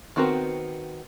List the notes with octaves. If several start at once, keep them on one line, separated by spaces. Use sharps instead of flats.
D#3 B3 C4 F#4 A#4